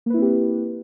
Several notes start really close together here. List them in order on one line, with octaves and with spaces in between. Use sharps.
A#3 B4 E4 C4 G4